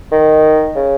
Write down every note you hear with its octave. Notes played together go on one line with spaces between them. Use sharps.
D#3
C#3